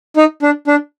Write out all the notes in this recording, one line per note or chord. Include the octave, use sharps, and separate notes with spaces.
D#4
D4
D4